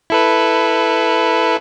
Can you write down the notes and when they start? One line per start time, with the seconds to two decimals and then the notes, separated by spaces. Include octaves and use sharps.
0.10 E4 A4 B4